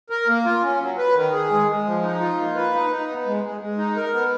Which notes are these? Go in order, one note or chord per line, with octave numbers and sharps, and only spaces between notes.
A#4
A#3
F4
C#4
F#3
B4
D#3
G#4
G#3
G#3
F3
D#4
F4
A#3
B4
D#4
D#4
B3
G#3
G#3
G#3
D#4
A#4
B3